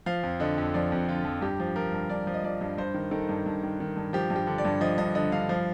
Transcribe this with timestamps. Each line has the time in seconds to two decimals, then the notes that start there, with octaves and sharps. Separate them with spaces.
0.06 F3 F5
0.23 F2
0.40 D3 D#5
0.58 F2
0.74 F3 D5
0.92 F2
1.08 D3 F4
1.25 F2
1.41 G2 G4
1.60 F3
1.76 F3 A#4
1.93 G2
2.09 G2 D5
2.27 F3
2.34 D#5
2.44 F3 D5
2.61 G2
2.78 G2 C5
2.94 D#3
3.11 D#3 A4
3.29 G2
3.46 G2
3.63 D#3
3.80 D#3
3.97 G2
4.13 F3 G4
4.30 G2
4.36 G4
4.47 D3
4.58 D5
4.65 G2
4.81 F3 D#5
4.98 G2 D#5
5.15 D3 D#5
5.32 G2 F5
5.49 F3